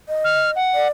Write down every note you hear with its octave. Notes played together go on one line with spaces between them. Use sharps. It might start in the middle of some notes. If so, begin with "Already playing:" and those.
D#5
F6
F#5
D5